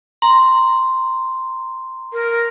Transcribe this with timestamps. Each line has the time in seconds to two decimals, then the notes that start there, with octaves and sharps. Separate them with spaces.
0.22 A#5 C6
2.13 A#4